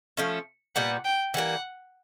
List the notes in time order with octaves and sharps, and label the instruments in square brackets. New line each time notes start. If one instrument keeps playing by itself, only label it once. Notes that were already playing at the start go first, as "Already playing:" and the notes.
[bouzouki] F3 A3 C#4
[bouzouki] A#2 G3 B3 [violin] F#5
[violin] G5
[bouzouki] E3 G3 A#3 [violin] F#5